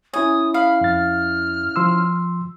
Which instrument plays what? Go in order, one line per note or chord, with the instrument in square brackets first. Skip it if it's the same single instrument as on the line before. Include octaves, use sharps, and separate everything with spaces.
[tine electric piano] C#4 E4 C#5 [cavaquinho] G#5 [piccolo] D#6
[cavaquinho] F5 [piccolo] B5
[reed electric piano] F2 A6 [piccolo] F6
[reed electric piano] F3 C6 E6